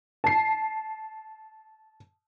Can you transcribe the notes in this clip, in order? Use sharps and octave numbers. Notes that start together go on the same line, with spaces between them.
A5 C7